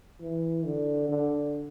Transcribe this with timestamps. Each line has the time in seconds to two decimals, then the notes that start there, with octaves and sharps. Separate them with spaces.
0.21 E3
0.66 D3
1.09 D3